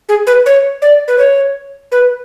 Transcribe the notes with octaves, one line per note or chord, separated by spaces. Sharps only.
G#4
B4
C#5
D5
B4
C#5
B4